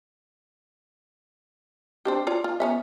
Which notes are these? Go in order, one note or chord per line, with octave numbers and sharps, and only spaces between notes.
C4 D4 G4
F4 C#5 D5
F4
B3 C#4 E5